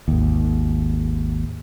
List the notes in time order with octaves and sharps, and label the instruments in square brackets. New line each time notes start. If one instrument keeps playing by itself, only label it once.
[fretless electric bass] G#1 D#2